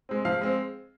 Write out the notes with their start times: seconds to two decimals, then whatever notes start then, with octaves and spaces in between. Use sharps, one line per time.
0.09 G#3 C4
0.25 F3 F5
0.41 G#3 C4